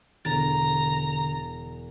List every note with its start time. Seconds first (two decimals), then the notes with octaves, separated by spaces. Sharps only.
0.25 E1 D3 A#5 A6